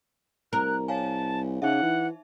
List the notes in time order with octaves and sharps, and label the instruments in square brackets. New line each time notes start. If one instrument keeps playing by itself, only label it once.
[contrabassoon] C2 [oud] A#4 [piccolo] F#6
[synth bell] C#5 F5 G#5 [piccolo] A5
[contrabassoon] C#3 [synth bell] D#4 E5 [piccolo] F#5
[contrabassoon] E3